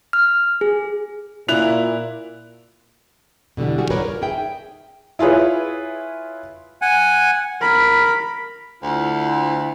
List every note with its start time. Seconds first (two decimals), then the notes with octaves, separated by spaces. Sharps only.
0.13 F6
0.61 G#4
1.49 A#2 E4 F#6 F7
3.57 B2 D3 E3 G3
3.78 G3 F#4 G#4
3.91 F4 A#4 B4 C#5 D5
4.05 A#4
4.21 D#4 G#4 E5 G5
5.19 E4 F4 G#4 B4 C#5
6.82 F#5 G#5
7.61 A#4 B5
8.83 D2 E4 F4